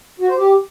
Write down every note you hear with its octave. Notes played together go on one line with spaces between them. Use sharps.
F#4
C5
G4